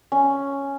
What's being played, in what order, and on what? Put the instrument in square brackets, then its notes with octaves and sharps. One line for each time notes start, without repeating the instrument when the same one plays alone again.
[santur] C#4